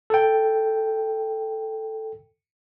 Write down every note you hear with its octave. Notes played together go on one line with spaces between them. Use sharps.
A4 G5